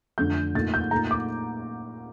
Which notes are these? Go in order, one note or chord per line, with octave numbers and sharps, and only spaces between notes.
F2 D3 A3 D4 G6
A#2 A3 D#4 A6
G6
A#2 A3 D#4 A#5
D6